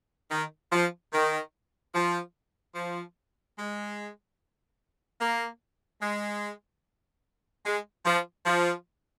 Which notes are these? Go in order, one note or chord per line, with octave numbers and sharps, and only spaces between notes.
D#3
F3
D#3
F3
F3
G#3
A#3
G#3
G#3
F3
F3